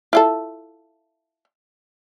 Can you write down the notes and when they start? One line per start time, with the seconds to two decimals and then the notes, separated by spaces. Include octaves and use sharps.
0.13 E4 F4 A4